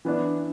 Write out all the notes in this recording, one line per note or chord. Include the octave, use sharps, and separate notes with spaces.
E3 B3 D4